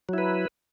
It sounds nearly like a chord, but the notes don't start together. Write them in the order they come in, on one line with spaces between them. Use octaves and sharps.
F#3 E4 B4